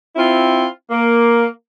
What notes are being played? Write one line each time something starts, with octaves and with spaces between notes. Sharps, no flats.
C4 E4 F4
A#3